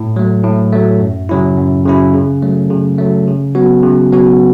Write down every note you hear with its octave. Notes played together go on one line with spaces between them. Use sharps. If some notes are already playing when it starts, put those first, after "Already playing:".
Already playing: A2
F#3 A3
A2
F#3 A3
F#2
C#3 F#3 C#4 E4
F#2
C#3 F#3 C#4 E4
C#3
F#3 A3
C#3
F#3 A3
C#3
F#3 B3 F#4
C#3
F#3 B3 F#4